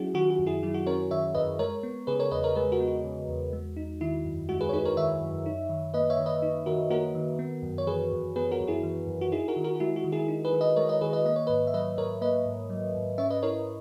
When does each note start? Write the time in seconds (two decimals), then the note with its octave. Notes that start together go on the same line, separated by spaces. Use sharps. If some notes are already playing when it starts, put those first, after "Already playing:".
Already playing: F#3 C#4 E4 F#4 G#4
0.14 D#3 F#4
0.30 F#4
0.39 F#2
0.46 E4 G#4
0.63 F#3 E4
0.74 F#4
0.86 C#4 A#4 C#5
1.11 D#3 C#5 E5
1.35 F#2 B4 D#5
1.59 G#3 A#4 C#5
1.83 B3
2.07 C#3 G#4 B4
2.20 A#4 C#5
2.31 E2 B4 D#5
2.44 A#4 C#5
2.55 G#3 G#4 B4
2.72 F#4 A#4
2.80 B3
2.88 F#4
3.04 C#3
3.29 E2
3.53 G#3
3.77 D#4
4.01 D#3 E4
4.25 F#2
4.49 G#3 F#4
4.61 G#4 B4
4.69 C#5
4.73 D#4 G#4 B4
4.85 A#4 C#5
4.97 D#3 C#5 E5
5.21 F#2
5.46 D#4
5.69 D#3
5.94 A#3 B4 D#5
6.10 C#5 E5
6.18 D#3
6.26 B4 D#5
6.42 D#4
6.66 D#3 F#4 A#4
6.90 A#3 F#4 A#4
7.15 D#3
7.39 B3
7.63 F#2
7.78 C#5
7.87 E3 G#4 B4
8.12 F#2
8.36 B3 G#4 B4
8.51 F#4 A#4
8.60 F#2
8.67 E4 G#4
8.83 E3
9.07 F#2
9.21 F#4
9.32 D#4 E4 G#4
9.48 F#4 A#4
9.56 D#3
9.64 F#4 A#4
9.76 F#4
9.80 G#3 E4
9.96 F#4
10.04 D#3
10.12 E4 G#4
10.28 D#4
10.45 G#4 B4
10.53 D#3
10.61 B4 D#5
10.76 G#3 A#4 C#5
10.89 B4 D#5
11.01 D#3 G#4 B4
11.13 B4 D#5
11.25 A#3 D#5
11.36 C#5
11.47 G#2 B4 D#5
11.67 E5
11.74 F#3 B4 D#5
11.98 G#2 A#4 C#5
12.21 A#3 B4 D#5
12.46 G#2
12.70 F#3
12.94 G#2
13.18 C#4 C#5 E5
13.30 B4 D#5
13.42 E4 A#4 C#5